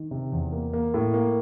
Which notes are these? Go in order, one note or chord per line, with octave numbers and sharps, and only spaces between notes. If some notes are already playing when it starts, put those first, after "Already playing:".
Already playing: D#3
C3
E2
A#3
A#3
A2
A#3